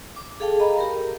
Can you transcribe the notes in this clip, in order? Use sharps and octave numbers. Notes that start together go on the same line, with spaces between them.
D6
G#4 A4 F5 G5 A5
D#5 A#5 B5
G4 A#4